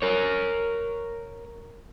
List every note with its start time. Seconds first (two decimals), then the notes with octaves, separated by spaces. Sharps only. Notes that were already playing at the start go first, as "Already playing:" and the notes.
0.02 A#4 C#5